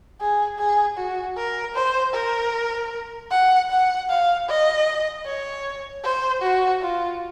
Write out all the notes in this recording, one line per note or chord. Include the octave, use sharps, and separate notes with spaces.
G#4
G#4
F#4
A#4
C5
A#4
F#5
F#5
F5
D#5
C#5
C5
F#4
F4